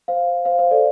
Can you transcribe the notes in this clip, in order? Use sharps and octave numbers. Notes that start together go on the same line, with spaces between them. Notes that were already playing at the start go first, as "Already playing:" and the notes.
C5 F5
C5 F5
C5 F5
A4 D5